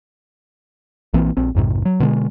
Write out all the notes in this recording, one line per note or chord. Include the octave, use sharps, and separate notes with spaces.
A#1 E3 A#3 C4
A#1 C4
A#1 F2 G#2 C3
F#3
B2 D3 G3 G#3